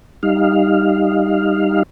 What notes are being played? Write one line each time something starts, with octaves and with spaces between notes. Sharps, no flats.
G3 D#4 F5